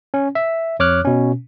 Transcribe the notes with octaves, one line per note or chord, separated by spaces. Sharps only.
C#4
E5
F2 C#5 D6 F6 F#6
B2 C#4